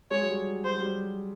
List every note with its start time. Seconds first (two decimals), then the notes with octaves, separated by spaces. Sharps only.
0.11 G#3 C#5
0.22 F#3
0.29 G3
0.47 F#3
0.64 G3 C5
0.72 F#3
0.80 G3